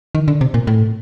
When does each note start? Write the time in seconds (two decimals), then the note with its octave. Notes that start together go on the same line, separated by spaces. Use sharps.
0.15 D#3
0.28 D3
0.41 C3
0.54 A#2
0.67 A2